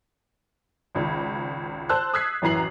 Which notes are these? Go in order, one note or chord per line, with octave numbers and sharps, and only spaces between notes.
G#1 C#2
C5 A5 E6 F#6
D#6 E6 F#6 G#6 B6 C7
A1 F#2 E3 A#5 C7 F#7